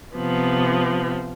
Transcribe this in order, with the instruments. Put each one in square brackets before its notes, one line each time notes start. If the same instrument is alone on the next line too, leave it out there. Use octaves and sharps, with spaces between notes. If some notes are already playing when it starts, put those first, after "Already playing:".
[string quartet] C3 F3 B3